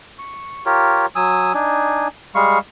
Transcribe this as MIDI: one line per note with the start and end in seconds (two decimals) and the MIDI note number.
0.19 0.64 85
0.66 1.06 65
0.66 1.06 67
0.66 1.06 70
0.66 1.06 73
1.16 1.53 54
1.16 1.53 80
1.16 1.53 87
1.16 1.53 88
1.54 2.08 62
1.54 2.08 63
1.54 2.08 80
2.35 2.59 55
2.35 2.59 56
2.35 2.59 77
2.35 2.59 85